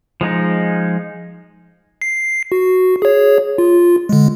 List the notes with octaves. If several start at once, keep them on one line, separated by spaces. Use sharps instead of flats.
F3 G#3 D#4
C7
F#4
G#4 C#5
F4
D3 G#3